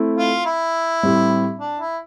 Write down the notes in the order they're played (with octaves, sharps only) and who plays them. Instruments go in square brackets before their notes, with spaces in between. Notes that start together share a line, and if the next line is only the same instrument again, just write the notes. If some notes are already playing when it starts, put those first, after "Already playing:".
Already playing: [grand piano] A3 C4 E4
[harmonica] F4
E4
[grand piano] A2 G3 C4 G4
[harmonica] D4
E4